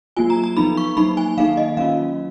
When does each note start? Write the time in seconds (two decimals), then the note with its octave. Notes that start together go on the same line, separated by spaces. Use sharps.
0.17 F#3 A#3 F4 G#5
0.30 A#5
0.44 A#5
0.57 F3 B3 D#4 B5
0.77 C#6
0.97 F#3 A#3 D#4 B5
1.17 G#5
1.37 D#3 A#3 D#4 F5
1.57 D#5
1.77 F#3 C#4 F4 F5